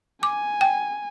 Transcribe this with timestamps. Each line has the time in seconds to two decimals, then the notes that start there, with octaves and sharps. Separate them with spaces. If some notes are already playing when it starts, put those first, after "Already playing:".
0.23 G#5 D6
0.61 G5